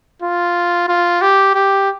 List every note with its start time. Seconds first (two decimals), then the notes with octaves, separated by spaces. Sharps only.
0.22 F4
0.89 F4
1.22 G4
1.55 G4